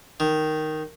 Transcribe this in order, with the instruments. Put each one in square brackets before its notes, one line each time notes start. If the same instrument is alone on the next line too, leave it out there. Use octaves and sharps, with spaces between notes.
[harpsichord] D#3